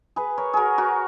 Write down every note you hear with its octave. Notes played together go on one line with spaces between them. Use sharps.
G#4 B4
A#4 C#5
F#4 G#4 A#4
F#4 A#4